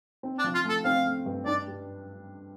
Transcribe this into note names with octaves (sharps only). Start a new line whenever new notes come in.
C4
D4
F3
F4
A3
A4
C4 F5
A3
G2
D4 D5
G3